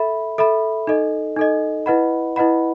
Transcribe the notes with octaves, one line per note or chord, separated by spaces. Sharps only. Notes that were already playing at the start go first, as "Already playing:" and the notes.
Already playing: A4 E5 B5
A4 E5 B5
D#4 A4 D#5
D#4 A4 D#5
E4 B4 D#5 F#5 B5
E4 B4 D#5 F#5 B5